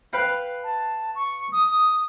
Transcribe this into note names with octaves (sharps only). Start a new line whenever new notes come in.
B4 F5 G5
A5
C#6
D#6